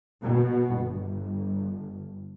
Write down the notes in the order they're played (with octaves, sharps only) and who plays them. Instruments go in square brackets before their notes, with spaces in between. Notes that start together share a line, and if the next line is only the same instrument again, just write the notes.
[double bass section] B2
G1